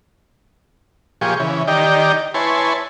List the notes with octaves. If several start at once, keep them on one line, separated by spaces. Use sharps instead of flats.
A#2 F3 G4 G#4 C#6
C#3 E3
D#3 D#4 G4 D5 G5
E4 B4 C#5 G#5 A5 C6